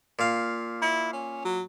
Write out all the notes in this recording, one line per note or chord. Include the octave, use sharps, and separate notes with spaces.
A#2 F5
E4
C#4
F#3